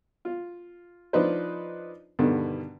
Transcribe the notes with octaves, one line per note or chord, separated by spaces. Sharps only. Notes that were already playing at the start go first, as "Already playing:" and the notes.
F4
F3 D4 D#4 B4 C5
G2 B2 D3 D#3